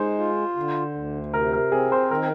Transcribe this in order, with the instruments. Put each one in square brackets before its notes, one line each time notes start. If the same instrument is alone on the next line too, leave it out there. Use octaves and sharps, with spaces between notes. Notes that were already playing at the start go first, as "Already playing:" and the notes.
Already playing: [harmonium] G#3 D#4 [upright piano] C5
[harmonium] F4
D3
D2
[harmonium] C3 [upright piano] A#4
[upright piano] A#4
[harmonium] C4 [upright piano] G#4
[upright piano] C5
[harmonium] D#3 [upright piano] A#4